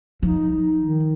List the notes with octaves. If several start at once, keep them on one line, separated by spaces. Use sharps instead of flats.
F3 D#4
D#4
D#3